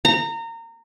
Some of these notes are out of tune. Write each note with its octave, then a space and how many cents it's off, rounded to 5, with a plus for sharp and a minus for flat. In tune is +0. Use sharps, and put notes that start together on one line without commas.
A#5 -25